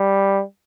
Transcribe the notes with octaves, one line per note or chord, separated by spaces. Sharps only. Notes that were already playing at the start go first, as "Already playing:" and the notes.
Already playing: G3